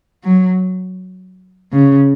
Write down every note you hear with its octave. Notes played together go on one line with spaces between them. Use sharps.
F#3
C#3